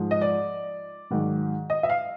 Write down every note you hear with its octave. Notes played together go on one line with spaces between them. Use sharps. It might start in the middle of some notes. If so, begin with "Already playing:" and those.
Already playing: G#2 F3
D#5
D5
G#2 D#3 F#3
D#5
E5
F5